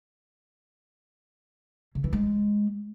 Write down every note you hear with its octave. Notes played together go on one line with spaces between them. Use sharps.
C#3
E3
G#3